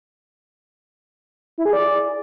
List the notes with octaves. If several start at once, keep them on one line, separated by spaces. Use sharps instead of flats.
E4
G#4
D5